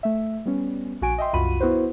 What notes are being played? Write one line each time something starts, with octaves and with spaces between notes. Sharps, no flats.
A3 E5
G3 B3 C#4
A#1 F#4 G#5 D7
D#5 E5 G5 C6
C2 F#2 F4 F#4 B5 D#7
B3 E4 F#4 B4 C5